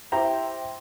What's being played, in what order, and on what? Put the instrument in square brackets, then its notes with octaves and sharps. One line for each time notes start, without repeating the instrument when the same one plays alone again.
[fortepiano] E4 G4 C5 G5 A#5